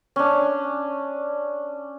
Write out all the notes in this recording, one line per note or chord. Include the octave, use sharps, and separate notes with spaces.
C#4 D4